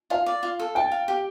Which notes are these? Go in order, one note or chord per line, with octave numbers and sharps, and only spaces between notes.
F4 F5
D5
F4
A4
G5 A5
F5
G4